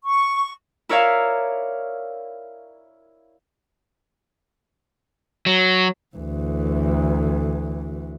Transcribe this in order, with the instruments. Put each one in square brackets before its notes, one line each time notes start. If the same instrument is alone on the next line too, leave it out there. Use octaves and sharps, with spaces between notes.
[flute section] C#6
[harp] E4 A#4 C#5 D5 E5 F5
[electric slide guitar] F#3
[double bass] D2 E3